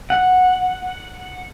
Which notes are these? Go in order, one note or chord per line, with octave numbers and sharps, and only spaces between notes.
F#5